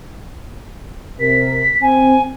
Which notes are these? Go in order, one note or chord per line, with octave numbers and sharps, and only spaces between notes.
C3 A#4 B6
C4 G#5